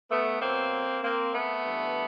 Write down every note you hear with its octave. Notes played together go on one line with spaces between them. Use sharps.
A3 B3
B2 F#3 A#3 C4
A#3 C4
A3 B3
G2 E3